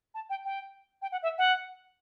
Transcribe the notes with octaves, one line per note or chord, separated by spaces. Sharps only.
A5
G5
G5
G5
F#5
E5
F#5